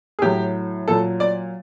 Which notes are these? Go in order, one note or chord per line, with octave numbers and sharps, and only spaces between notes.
G#4
A2 F#3 G4
A#2 F#3 A4
D5